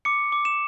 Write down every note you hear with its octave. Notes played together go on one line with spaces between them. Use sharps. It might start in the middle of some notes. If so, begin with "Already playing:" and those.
D6 C#7
D6
E7